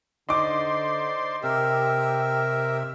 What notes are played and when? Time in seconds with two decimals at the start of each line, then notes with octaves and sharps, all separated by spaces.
0.29 D3 D#4 C5 D5 C6 D6
1.43 C3 G4 A#4 E5